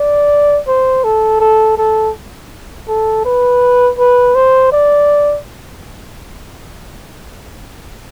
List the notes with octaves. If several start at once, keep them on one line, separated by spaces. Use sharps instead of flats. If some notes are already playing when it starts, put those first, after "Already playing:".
Already playing: D5
C5
A4
A4
A4
A4
B4
B4
C5
D5